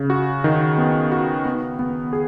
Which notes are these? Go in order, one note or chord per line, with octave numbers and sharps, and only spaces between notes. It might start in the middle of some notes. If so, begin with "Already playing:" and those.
Already playing: C#3
F#4
D#3
B3
F#4
B3
B3
G#4